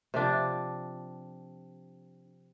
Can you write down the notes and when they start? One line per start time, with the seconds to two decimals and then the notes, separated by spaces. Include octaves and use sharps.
0.14 C3 F3 D4